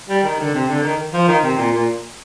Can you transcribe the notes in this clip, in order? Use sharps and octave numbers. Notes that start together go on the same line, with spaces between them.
G3
D#3
D3
C3
D3
D#3
F3
D#3
C3
A#2
A#2